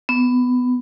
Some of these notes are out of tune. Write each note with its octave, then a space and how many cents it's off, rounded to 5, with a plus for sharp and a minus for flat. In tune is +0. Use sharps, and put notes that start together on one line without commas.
B3 +15